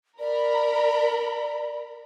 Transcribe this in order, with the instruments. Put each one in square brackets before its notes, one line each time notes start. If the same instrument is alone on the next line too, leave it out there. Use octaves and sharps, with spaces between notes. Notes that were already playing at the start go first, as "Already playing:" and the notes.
[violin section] A#4 A#5 B5 [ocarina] D5